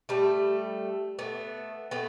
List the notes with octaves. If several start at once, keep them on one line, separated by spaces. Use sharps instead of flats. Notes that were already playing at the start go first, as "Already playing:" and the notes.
G3 A3
A3 B3
A3 B3